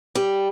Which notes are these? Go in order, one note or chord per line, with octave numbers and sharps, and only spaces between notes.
G3